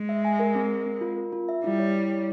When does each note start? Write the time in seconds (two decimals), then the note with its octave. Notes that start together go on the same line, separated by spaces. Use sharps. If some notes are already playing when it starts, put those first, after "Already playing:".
Already playing: G#3
0.09 E5
0.25 G#5
0.39 A#4
0.55 C4
0.71 A#4
0.86 C4
1.01 F4
1.17 A#4
1.33 F4
1.49 E5
1.64 G3 E4
1.79 C#5
1.95 E4
2.10 C#5